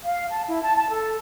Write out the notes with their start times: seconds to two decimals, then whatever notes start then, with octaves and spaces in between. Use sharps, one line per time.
0.04 F5
0.30 A5
0.48 E4
0.62 A5
0.75 A5
0.90 A4